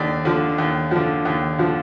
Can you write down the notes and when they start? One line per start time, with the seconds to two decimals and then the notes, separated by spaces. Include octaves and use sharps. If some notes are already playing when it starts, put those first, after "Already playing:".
Already playing: D#2 D3 D5
0.25 D3 F3
0.58 D#2
0.91 D3 F3
1.25 D#2
1.58 D3 F3